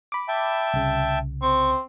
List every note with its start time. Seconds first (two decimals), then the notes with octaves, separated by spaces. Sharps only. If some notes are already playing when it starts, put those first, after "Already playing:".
0.12 B5 D6
0.28 E5 G5 A5
0.74 C2 C#3
1.42 C4 C#6